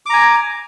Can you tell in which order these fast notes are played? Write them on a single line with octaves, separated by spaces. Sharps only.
D6 A#5 G#5